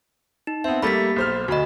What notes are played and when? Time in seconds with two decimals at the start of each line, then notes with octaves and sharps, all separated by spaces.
0.47 D#4
0.64 B3 C4 E5
0.82 G3 A3 A#3 B5 A6 B6
1.16 B1 C5 F6
1.48 D2 F#4 D#5 B5